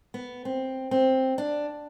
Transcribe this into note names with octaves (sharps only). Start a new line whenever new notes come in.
B3
C4
C4
D4